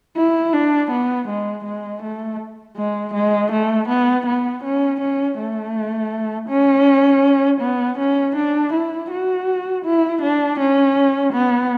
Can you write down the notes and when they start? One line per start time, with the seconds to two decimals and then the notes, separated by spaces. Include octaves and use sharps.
0.16 E4
0.53 D4
0.91 B3
1.28 G#3
1.64 G#3
2.02 A3
2.76 G#3
3.14 G#3
3.52 A3
3.88 B3
4.26 B3
4.63 C#4
5.00 C#4
5.38 A3
6.49 C#4
7.61 B3
7.98 C#4
8.36 D4
8.73 E4
9.10 F#4
9.85 E4
10.21 D4
10.59 C#4
11.33 B3